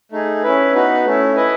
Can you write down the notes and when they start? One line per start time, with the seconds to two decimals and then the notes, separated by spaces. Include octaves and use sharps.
0.12 A3 D#4 G#4
0.43 C#4 E4 B4
0.74 B3 D#4 F#4 B4
1.05 A3 C#4 E4
1.36 E4 B4 D#5 G#5